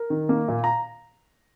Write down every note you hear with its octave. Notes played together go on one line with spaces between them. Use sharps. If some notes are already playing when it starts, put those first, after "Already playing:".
Already playing: A#4
D#3
A#3
A#2
A#5